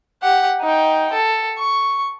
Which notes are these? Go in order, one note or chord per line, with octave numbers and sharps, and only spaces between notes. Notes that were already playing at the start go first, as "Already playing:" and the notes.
G4 F#5
D#4 G5
A4
C#6